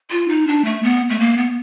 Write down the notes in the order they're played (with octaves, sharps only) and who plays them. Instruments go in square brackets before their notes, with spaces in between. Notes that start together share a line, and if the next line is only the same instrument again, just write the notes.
[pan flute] F4
D#4
D4
A3
B3
A3
A#3
B3